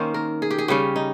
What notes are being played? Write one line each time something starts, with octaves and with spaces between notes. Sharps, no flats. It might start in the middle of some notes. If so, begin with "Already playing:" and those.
Already playing: D#3 A#3 C#4 C5
A#4
G#4
G4
G#4
C#3 G3 C#4 G4
D#4